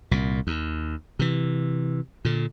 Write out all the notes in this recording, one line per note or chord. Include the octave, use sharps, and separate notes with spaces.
C2 A#2
D#2
C3 E3
A#2 D3